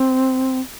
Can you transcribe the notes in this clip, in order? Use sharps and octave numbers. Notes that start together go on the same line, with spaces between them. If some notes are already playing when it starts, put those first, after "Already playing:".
Already playing: C4